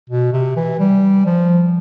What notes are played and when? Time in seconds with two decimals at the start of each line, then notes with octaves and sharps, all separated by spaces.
0.10 B2
0.33 C3
0.57 E3
0.80 G3
1.26 F3